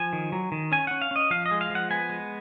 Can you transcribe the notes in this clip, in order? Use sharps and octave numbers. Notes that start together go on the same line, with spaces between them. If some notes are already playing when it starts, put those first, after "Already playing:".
Already playing: F3 G#5
D#3
F#3
D#3
C#4 G#5
C#4 F#5
F5
C#4 D#5
F3 F5
D#5
G#3
F5
F3
F#5
B3 G#5
G#3